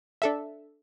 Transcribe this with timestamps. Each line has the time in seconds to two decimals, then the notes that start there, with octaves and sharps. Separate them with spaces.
0.22 D4 A4 E5